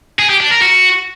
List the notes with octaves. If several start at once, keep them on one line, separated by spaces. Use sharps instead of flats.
G#4
G4
D4
A#4
F#4